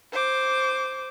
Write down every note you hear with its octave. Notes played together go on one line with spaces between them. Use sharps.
C5 D6